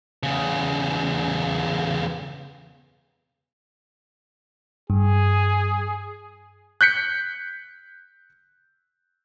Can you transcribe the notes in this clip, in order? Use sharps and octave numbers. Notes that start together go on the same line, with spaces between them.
E2 C#3
G2 G#4
F#6 G6 B6 C#7